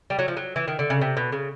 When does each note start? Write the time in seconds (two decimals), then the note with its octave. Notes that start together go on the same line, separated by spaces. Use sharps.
0.10 G3
0.19 F#3
0.28 F3
0.37 F#3
0.56 E3
0.68 D#3
0.79 D3
0.90 C#3
1.01 C3
1.17 B2
1.32 C#3